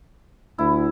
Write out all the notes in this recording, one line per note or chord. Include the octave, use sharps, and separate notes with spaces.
D2 E4